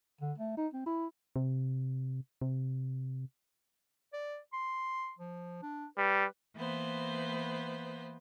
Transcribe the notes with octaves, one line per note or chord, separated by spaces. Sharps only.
D3
A3
D#4
C4
E4
C3
C3
D5
C6
F3
D4
G3 B4
E3 A#3 B3 B4 C5